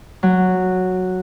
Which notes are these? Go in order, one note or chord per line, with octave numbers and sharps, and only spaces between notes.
F#3